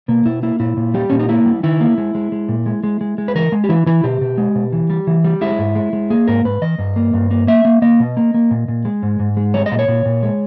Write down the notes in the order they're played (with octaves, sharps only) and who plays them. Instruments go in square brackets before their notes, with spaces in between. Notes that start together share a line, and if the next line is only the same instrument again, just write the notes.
[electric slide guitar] B2 A#3
B2 E4
A#3 E4
A#2 E4
A#2
G3 G4
A#2 C#4
D#4
A#3 E4
G3
D#3 E4
A#3
G#3
G#3
G#3
A#2
G#3
G#3
G#3
G#3
B4
E3 A#4
G#3
G4
E3 E4
E3 E4
B2 G4
B2
G#3
B2
E3
G3
E3
G3
G#3 E4
G#2
G#3
G#3
A#3 G#4
G#2 A#4
G#2 B4
E3 D#5
G2
A#3
G2
A#3
A#3 E5
A#3
A#3 D#5
B2
A#3
A#3
A#2
A#2
G#3
G#2
G#2
G#3
G3 C#5
D#5
A#2
C#5
A#2
A#2
G#3